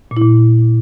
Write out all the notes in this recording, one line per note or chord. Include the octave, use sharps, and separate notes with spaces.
A#2
E4
A#2